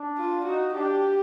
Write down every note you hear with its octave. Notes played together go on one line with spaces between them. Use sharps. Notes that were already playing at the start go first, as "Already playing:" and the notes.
Already playing: D4
F4
D#4 F#4
D4 G4